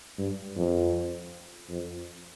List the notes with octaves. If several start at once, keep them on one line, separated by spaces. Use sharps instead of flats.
G2
F2
F2